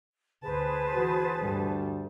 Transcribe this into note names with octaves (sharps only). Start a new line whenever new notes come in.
D2 G#4 B4 C5 A5
E3 F#4
D2 G2 G3